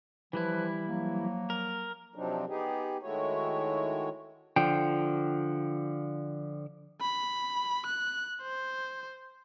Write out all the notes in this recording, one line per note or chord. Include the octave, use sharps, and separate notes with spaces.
E3 F3 G3 E4 B4
F3 F#3 A#3
A#4
C3 F3 F#3 C4 D4 D#4
B3 D#4 G4 G#4
D#3 G#3 A3 E4 F#4 C#5
D3 F3 G5
B5
F#6
C5